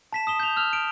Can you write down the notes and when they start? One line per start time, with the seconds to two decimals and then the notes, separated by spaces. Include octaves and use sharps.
0.13 A5 B6 E7
0.27 D#6 E7 G7
0.40 G6 F7
0.56 E6 F6 F7
0.73 D7